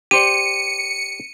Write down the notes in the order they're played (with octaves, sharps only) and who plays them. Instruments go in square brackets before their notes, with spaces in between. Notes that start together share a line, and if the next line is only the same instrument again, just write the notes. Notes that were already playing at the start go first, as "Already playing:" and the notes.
[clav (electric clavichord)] G4 C5 D5 [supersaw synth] C#7 [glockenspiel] D#7